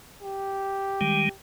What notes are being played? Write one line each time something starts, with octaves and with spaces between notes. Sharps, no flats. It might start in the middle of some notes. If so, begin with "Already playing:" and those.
G4
D#3 G3 G#3